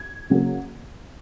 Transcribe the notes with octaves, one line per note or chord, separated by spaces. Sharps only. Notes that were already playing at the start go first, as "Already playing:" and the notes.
Already playing: G#6
C#3 F#3 A#3